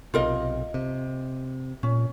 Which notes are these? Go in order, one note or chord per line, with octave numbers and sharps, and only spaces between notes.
B1 C3 F4 A#4 D#5
C3
A#2 C#4